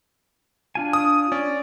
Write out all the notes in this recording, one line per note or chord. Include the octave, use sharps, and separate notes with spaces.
D4 F4 G#5
D#6
C#4 D5